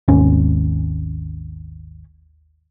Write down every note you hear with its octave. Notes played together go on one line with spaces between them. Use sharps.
G#1 D#2 C#4